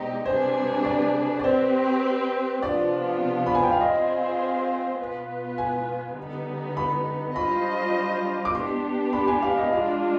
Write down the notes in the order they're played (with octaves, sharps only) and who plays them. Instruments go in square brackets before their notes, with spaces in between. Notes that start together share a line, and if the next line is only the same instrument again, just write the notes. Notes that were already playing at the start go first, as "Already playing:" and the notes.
Already playing: [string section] B2 G#3 C4 D#4 G4 [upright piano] D5 D#5
[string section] C3 G3 D4 G#4 B4 [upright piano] C5
[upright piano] D5
D5
[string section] C4 G4 B4 [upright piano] C5
[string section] C3 F3 B3 D4 F4 [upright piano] D5
[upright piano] B5
G#5
G5
F5
[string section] C4 F4 G#4 C5 [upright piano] D#5
[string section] B2 B3 F4 B4
[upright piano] G#5
[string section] D3 G3 B3 D#4
[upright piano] B5
[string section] G3 D4 F4 C5 D#5 [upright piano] B5
[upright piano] D6
[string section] B3 D4 G4 [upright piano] C6
[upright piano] B5
G#5
F5
D#5
[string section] G#3 D4 F4 [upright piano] F5